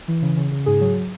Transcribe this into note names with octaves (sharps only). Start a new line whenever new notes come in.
E3
C#3
C#3
C#3
G#2 G#4
F#3